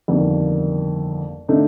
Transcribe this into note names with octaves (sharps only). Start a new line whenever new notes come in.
G1 F2 D#3 A#3
D3 A3 D#4